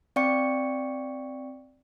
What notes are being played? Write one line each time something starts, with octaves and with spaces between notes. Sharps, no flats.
C4 D5 F5 G5 C#6 C#7